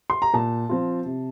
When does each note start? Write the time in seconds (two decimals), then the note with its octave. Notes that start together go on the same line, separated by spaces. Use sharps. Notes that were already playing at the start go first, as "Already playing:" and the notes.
0.10 C6
0.22 A#5
0.33 A#2 A5
0.69 F3 C4 F4
1.06 C3